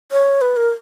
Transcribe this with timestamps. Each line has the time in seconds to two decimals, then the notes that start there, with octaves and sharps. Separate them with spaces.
0.12 C#5
0.41 B4
0.57 A#4